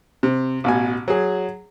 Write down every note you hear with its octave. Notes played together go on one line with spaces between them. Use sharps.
C3
A1 B2 G#5
F#3 G#4